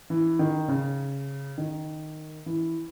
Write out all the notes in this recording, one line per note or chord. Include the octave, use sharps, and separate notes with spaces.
E3
D#3
C#3
D#3
E3